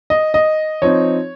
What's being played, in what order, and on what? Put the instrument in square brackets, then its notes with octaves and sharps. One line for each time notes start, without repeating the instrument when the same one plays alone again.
[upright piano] D#5
D#5
F3 C4 D#4 C#5